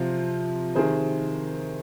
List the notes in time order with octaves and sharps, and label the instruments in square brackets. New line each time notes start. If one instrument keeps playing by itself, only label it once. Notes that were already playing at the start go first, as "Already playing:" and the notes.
Already playing: [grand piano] C3 F3 F4
C3 D#3 G#4 C5